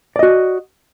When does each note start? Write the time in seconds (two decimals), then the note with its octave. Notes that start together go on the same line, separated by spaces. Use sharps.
0.16 D5
0.19 D#5
0.23 F#4